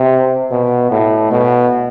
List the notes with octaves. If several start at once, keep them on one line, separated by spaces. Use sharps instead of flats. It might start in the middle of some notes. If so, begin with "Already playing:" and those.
Already playing: C3
B2
A2
B2